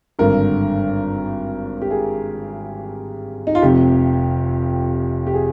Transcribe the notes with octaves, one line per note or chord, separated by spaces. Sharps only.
G#1 G2 D3 A#4
G4
G#4
D#4
F4
F1 F2 C3 G4
G4
G#4